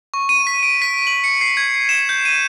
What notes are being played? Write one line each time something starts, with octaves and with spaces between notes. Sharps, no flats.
C#6
D#7
B6
D7
B6
F#7
C#7
C7
G#6
E7
G6
D#7